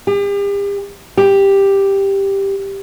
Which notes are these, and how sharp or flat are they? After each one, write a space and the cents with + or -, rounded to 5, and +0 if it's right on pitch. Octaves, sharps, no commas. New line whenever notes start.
G4 +40
G4 +5